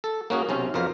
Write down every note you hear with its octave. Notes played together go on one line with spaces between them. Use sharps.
A4
A#3 C#4 F#4 G#4
B1 C3 C#4 C5
F2 B2 A#4 C5 F5